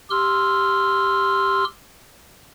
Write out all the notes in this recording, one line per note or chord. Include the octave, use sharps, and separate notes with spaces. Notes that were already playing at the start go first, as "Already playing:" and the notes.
G4 C6 E6 F6